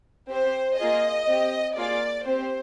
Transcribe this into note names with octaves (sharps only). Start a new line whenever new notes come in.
C4 G4 C5
A#3 F4 G#4 D#5
C4 G4
A#3 F4 G#4 D5
C4 G4 C5